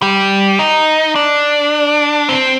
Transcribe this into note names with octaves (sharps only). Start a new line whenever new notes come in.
G3
D#4
D4
C4